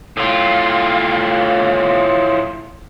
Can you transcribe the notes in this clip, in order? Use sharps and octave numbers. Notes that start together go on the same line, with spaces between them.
A2 F4